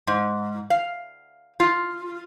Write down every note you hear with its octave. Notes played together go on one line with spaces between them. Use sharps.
G#2
F5
F4